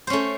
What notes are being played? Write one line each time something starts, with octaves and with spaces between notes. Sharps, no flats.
A3 C#4 C5